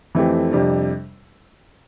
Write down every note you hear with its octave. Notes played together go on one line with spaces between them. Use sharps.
F2 E3 A3 C4 G4
F2 C3 G3 D4